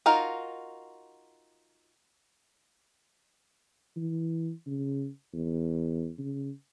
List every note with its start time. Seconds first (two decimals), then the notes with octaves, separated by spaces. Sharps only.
0.06 D#4 F4 F#4 A#4
3.97 E3
4.66 C#3
5.34 E2
6.18 C#3